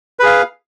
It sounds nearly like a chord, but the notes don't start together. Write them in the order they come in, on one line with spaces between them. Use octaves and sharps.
B4 G#4 F5